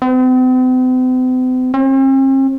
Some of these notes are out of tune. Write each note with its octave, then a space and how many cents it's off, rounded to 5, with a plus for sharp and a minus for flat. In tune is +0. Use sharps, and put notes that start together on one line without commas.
C4 -45
C4 +45